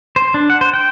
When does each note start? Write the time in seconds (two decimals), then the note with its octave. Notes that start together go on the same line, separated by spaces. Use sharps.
0.16 C5
0.34 D4
0.50 F#5
0.61 C5
0.74 G5